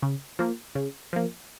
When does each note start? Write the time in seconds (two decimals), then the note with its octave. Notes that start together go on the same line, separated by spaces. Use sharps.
0.02 C#3
0.39 F3 A#3
0.75 C#3
1.13 F3 A#3